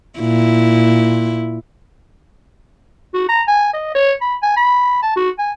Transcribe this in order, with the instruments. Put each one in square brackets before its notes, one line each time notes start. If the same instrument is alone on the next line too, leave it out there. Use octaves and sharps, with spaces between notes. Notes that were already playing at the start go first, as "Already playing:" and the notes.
[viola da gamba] A#2 E4
[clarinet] F#4
A#5
G#5
D#5
C#5
B5
G#5
B5
A5
F#4
G#5